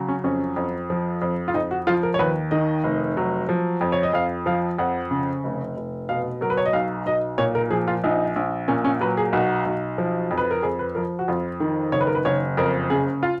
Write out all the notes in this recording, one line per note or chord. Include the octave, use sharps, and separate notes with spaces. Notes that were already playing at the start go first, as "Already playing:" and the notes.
Already playing: C#3 F#3
C#4
F2 C#4
F2
F3
F2
F4
F2 D#4
F#4
F3 F4
A#4
C#5
D#2 B4
D#3 D#5
F1
F#3
F3
F2
C#5
D#5
F2 F5
F3 F5
F2 F#5
C#3
F1
F1
B2 F5
F#3 A#4
B4
C#5
D#5
B1 F5
B1 D#5
A#2 C#5
A#4
F3 G#4
F4
A#1 D#4
A#1
A#2 C#4
C#4
F#3 B4
G#4
B1 F#4
B1
F3
F2
B4
A#4
F2 G#4
B4
F3 A#4
F#4
F2 F4
D#3
F#1 C#5
B4
A#4
B4
F#1 C#5
F2 A#4
C#3 G#4
F4